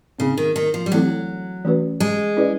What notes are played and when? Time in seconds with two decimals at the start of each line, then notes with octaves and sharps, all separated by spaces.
0.19 C#3 C4 D#4 G#4
0.38 D#3
0.56 D#3
0.74 F3
0.86 G3
0.92 E3 F#3 A3 C4 E4 A4
1.65 E3 A3 C#4 F#4 B4
2.00 G#3
2.37 C#4 E4 G#4 B4 D5